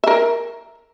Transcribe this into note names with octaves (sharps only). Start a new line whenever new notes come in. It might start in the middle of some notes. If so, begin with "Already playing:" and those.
A#4 E5